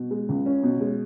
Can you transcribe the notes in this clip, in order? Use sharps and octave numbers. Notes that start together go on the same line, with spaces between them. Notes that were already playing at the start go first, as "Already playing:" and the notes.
Already playing: B2
G#3
C#2
C#4
B2
G#3